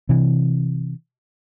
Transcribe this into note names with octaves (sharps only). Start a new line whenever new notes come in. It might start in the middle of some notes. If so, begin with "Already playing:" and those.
C3 E3